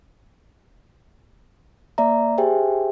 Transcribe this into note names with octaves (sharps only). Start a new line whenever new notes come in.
A#3 D5 E5 A#5
G4 G#4 C5 E5 G5 G#5